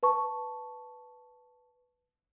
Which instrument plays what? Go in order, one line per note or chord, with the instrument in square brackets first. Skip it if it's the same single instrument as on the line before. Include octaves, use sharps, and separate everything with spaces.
[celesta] B4 A5 C#6